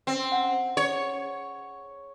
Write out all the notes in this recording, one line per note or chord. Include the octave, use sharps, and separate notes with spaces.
C4
F#5
C#5